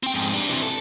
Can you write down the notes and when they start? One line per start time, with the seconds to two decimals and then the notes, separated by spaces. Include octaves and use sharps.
0.03 C4 G5
0.15 F2 G#2
0.34 G3 D4
0.49 C3 E3
0.63 A4